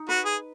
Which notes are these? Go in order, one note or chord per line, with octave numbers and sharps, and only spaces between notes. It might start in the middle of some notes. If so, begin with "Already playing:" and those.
Already playing: D#4
F#4 B4
G#4